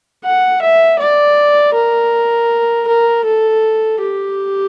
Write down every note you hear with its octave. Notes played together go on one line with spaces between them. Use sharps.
F#5
E5
D5
A#4
A#4
A4
G4